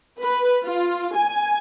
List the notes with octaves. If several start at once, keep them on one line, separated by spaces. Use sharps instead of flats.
B4
F4
G#5